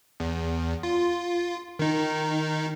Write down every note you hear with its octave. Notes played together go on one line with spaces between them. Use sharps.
E2
F4
D#3 D#4